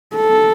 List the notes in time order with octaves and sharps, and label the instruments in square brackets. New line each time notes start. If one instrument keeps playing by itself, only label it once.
[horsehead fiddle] A4